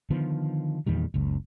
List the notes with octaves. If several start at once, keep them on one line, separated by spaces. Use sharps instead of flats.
D3 D#3 F3 B3
E2 A#2 D#3 G3
F#1 C#2